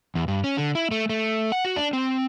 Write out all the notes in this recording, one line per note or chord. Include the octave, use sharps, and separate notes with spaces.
E2
G2
C#4
D3
E4
A3
A3
F#5
F#4
D4
C4